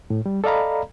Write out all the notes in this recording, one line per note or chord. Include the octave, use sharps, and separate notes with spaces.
A2
G3
A4 D5 D#5 F5 A#5 B5